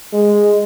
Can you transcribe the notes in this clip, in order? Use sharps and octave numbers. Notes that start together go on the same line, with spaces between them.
G#3